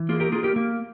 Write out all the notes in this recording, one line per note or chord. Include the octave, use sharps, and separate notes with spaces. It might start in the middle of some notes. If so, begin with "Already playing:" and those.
Already playing: E3
A#3 F4 G#4
G4 A#4
A#3 F4 G#4
G4 A#4
A#3